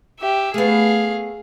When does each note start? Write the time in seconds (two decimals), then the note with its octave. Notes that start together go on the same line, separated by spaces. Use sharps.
0.20 G4 E5
0.54 A3 B3 G#4 F5